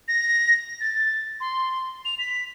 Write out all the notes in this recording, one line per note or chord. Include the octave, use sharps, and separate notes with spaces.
A#6
A6
C6
F7
B6